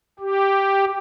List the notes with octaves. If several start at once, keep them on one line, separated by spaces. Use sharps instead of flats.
G4